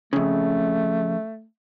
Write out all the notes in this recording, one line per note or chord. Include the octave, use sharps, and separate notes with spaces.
F2 C#3 A3